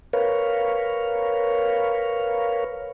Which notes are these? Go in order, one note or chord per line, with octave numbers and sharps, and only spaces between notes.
A#4 B4 C#5 F5